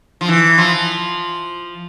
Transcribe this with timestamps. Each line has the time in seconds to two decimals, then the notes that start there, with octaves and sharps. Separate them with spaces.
0.21 F3
0.28 E3
0.58 F3